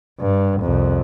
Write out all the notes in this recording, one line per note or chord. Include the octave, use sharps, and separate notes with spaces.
G2
C2 F2